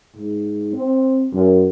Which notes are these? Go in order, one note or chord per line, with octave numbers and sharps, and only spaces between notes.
G#2
C4
F#2